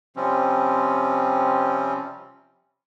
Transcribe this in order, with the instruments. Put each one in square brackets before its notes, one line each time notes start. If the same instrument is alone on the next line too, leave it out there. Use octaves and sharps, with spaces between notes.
[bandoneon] C3 F3 G3 C4 C#4